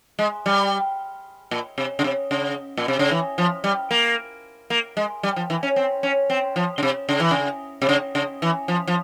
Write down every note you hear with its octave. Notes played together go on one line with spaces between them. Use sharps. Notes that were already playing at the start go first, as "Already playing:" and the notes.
G#3
G3
A#2
C3
C#3
C3
C#3
A#2
C3
C#3
E3
F3
G3
A#3
A#3
G#3
G3
F3
E3
C#4
C4
C#4
C4
F3
C#3
C3
C#3
E3
C#3
C3
C#3
C#3
E3
F3
F3